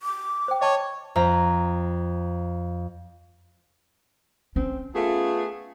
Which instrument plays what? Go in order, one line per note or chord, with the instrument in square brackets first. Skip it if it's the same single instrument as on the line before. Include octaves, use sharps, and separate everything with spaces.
[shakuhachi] D6
[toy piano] C5 G5
[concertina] C#5 [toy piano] D#5 A5 C#6
[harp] F2 A#5 B6
[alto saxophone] C4 [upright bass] C#4
[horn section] A3 B3 [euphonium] F4 [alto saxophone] G#4